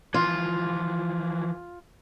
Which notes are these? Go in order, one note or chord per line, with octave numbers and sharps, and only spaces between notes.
E3 F3 F4